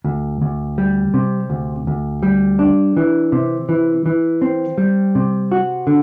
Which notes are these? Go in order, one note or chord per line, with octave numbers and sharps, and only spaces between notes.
D2
D2
G3
C3
D2
D2
G3
D4
E3
C3
E3
E3
C4
G3
C3
F#4
D3